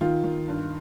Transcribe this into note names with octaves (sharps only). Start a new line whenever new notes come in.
D#3 F4
D#3
G2